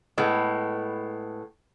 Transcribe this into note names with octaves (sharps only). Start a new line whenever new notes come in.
A2 G#3 B3